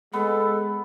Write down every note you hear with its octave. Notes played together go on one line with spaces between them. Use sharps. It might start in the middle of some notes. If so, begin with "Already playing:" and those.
G#3 B3 A4